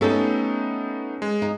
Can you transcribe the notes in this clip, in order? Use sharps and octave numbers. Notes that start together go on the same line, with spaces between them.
A3 B3 C#4 D#4 G4 A4
G#3
D#4